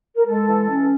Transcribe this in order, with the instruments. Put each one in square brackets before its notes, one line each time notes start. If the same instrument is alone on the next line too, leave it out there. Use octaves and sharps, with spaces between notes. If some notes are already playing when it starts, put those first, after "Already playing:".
[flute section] A#4
[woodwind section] G#3 [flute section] A4
[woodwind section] E3
C#4